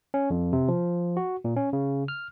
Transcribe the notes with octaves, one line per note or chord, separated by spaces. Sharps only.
C#4
F2
C3
F3
F#4
A#2
C#4
C#3
F6